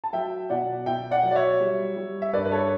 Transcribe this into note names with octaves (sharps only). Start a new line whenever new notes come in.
A5
F#3 E5 G5
B2 D5 F#5
B2 E5 G5
D5 F#5
F#3
D5
C#5 E5
G3
G3
E5
G2 B4 D5
B4
A4 C#5